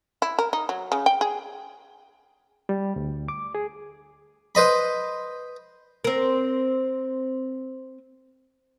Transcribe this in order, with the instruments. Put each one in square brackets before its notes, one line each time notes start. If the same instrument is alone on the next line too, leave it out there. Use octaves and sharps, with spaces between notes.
[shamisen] E4
A#4
D#4
F#3
C#3
G5
G#4
[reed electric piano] G3
D2
D6
G#4
[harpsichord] B4 C5 D#5 B5
[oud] C4 A#4